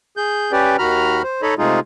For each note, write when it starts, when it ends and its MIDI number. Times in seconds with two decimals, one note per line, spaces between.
0.17 0.52 68
0.17 0.52 91
0.52 0.77 61
0.52 0.77 67
0.52 0.77 71
0.52 0.77 74
0.52 0.77 79
0.79 1.22 39
0.79 1.22 51
0.79 1.22 66
0.79 1.22 82
0.79 1.22 83
0.79 1.22 89
1.23 1.42 72
1.42 1.54 63
1.42 1.54 69
1.42 1.54 73
1.42 1.54 75
1.42 1.54 83
1.58 1.80 48
1.58 1.80 56
1.58 1.80 57
1.58 1.80 63
1.58 1.80 65
1.58 1.80 68